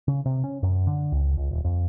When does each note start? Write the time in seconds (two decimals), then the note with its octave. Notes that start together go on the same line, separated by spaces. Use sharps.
0.08 C#3
0.26 C3
0.44 C#4
0.63 F#2
0.87 D3
1.12 C#2
1.37 C#2
1.51 D#1
1.64 F2